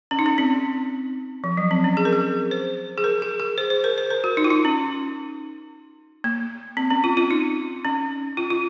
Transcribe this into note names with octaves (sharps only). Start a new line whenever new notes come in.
C#4
D#4
C#4
C4
F3
F#3
C4
C#4
G#4
A#4
G#4
C5
G#4
A#4
G#4
G#4
C5
C5
A#4
C5
A#4
F#4
D#4
F4
D#4
C#4
A#3
C4
C#4
F4
F4
D#4
C#4
F4
F4